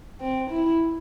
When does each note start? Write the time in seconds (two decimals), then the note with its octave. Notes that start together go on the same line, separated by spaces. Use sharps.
0.21 C4
0.50 E4